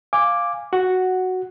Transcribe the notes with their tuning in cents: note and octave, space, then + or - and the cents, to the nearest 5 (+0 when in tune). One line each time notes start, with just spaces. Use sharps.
F5 +0 G#5 -15 D6 +0
F#4 +0 F#5 +5